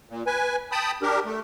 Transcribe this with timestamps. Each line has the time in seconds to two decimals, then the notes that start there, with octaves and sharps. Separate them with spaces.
0.09 A#2
0.27 B4 G#5
0.72 G5 A5 B5 D#6
1.02 D4 G4 A#4
1.25 A3